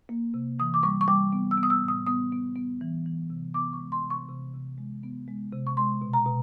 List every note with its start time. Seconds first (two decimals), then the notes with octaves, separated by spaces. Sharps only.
0.09 A#3
0.34 C3
0.59 E3 D#6
0.74 D6
0.83 G3 C#6
1.01 C#6
1.08 G3 D6
1.33 B3
1.51 E6
1.58 B3
1.63 D#6
1.70 E6
1.82 A2
1.88 D#6
2.07 B3 D#6
2.32 B3
2.56 B3
2.81 E3
3.06 E3
3.30 C3
3.54 B3 D6
3.73 C#6
3.80 G#3
3.92 C6
4.04 C3
4.10 C#6
4.28 C3
4.54 C3
4.78 G#3
5.03 B3
5.28 G#3
5.53 C3
5.67 C#6
5.77 G#3 C6
6.02 B2
6.13 A#5
6.26 B2